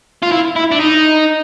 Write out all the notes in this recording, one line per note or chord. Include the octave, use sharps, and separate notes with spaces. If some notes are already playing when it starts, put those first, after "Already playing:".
F4
E4
E4
D4
D#4